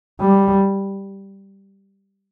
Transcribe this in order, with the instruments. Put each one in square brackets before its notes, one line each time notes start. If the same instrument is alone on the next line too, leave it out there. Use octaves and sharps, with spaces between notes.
[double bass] G3